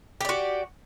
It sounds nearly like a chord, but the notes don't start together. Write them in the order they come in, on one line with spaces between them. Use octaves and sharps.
G4 D5 F#4